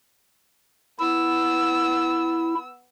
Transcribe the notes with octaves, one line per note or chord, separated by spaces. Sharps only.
B3 E4 E6